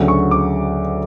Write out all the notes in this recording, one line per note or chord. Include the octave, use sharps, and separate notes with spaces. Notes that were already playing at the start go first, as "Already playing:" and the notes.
Already playing: D2 C#3 F#3
C#6
D6